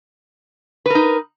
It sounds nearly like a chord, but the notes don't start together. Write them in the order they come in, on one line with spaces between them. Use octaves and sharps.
B4 A#4 D#4